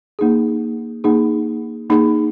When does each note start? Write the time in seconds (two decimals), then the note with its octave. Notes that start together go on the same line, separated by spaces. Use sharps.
0.19 A#3 D#4 G#4
1.04 A#3 D#4 G#4
1.90 A#3 D#4 G#4